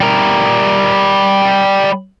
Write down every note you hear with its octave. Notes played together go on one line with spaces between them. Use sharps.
G3 A#4